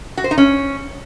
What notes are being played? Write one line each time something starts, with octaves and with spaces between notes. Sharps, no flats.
F#4
C5
D#4
C#4